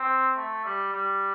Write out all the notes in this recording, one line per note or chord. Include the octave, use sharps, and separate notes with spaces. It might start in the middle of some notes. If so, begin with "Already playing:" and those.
Already playing: C4
A3
G3
G3